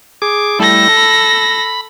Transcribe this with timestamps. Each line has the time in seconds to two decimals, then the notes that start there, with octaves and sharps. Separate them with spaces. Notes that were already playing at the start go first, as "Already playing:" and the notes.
0.22 G#4 D6
0.60 G3 A3 E4 A4 A#6
0.97 B5